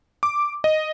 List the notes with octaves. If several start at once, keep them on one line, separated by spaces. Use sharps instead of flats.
D6
D#5